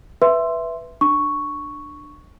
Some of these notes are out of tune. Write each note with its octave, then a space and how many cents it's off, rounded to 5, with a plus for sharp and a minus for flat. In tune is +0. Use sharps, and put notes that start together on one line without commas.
B4 +0 E5 +5 C6 +0
D4 +20 C#6 +0